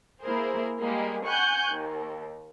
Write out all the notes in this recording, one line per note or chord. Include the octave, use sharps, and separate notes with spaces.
A#3 E4 G#4 A#4 C5
G3 G#3 A#3 G#4
F#5 G#5 C#6 F#6 G6
D#2